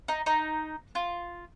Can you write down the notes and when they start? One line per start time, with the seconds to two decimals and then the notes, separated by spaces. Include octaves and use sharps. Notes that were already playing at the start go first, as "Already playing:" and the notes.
0.08 D#4
0.26 D#4
0.95 F4